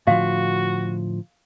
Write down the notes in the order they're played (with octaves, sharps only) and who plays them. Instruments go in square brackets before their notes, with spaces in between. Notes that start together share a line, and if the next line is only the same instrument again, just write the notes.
[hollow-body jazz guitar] A2 D3 F3 [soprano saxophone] F#4 [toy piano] F5